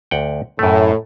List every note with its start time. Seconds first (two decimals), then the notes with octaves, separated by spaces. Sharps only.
0.11 D2 F#5 G5
0.59 F#2 A2 A3